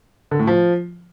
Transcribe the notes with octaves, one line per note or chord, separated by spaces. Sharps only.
D3
A2
F3